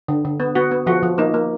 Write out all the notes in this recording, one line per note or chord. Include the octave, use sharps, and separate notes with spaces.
D3
D3
B3
B3 F#4
B3
F3 F#4
F3
A#3 D#4
A#3